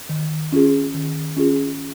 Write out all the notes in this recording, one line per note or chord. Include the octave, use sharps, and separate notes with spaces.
D#3
C#4 F4 G#4
D#3
C#4 F4 G#4